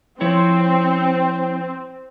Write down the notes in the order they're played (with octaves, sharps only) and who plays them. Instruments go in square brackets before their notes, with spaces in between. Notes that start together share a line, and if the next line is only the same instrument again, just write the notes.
[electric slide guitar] F3 E4 C#5 [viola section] C4